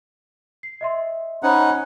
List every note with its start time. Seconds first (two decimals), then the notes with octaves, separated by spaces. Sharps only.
0.63 C7
0.81 D#5 E5 C6
1.43 C#4 D#4 C5 F#5 B5